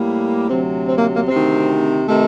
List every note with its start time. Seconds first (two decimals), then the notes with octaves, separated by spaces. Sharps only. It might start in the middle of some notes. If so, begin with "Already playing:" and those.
Already playing: A2 G3 A#3
0.49 D2 C3 F#3 C4
0.88 C4
0.98 A#3
1.16 A#3
1.28 D2 C3 D#3 C4
2.08 C3 D#3 A3